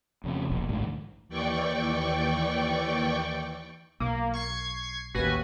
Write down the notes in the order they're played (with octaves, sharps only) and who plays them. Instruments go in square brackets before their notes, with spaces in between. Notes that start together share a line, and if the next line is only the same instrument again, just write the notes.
[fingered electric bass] F2 C#3
E1 A#1
A1 D2 G#2
[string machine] D#2 E3 D5 G5 C#6
[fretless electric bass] B1 [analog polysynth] A#3
[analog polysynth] C#6 G#6 C7
[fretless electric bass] A1 D#2 [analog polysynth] F#4 B4 G#5